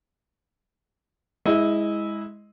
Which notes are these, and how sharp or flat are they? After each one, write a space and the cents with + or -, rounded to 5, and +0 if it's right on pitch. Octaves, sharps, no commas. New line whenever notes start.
G#3 +0 E4 -15 D#5 +0